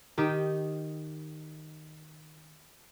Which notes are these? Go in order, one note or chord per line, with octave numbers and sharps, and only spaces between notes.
D#3 D#4 G4